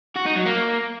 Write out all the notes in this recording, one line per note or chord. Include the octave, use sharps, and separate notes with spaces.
F#4
D#4
F#3
A#3